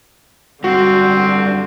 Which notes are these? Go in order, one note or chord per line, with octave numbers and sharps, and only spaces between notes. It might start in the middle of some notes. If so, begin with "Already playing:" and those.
F#2 D3 G3 C4 F#4